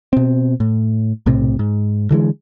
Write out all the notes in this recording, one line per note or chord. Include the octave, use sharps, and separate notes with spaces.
B2 C4
A2
B1 A2 C3
G#2
D3 E3 G#3